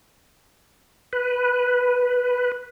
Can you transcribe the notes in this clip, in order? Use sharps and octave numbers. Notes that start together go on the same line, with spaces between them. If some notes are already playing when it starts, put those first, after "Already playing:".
B4